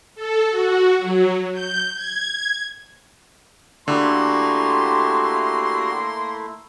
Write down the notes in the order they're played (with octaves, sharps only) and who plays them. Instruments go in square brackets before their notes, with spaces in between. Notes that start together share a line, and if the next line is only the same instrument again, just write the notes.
[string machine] A4
F#4
F#3
G6
G#6
[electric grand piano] D3 [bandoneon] A3 E4 [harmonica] A#3 A#5 C6 [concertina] F#4 G4